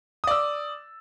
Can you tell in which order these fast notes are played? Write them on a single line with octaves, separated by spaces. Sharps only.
D#6 D5 E6